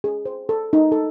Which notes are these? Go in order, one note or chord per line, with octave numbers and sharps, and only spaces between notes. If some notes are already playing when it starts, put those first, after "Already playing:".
G#4
C5
A4
D#4
A4